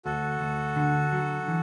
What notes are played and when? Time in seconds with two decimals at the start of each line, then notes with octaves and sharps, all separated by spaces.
0.05 D2 F#4 A4
0.41 D2
0.76 D3
1.12 F#3
1.48 E3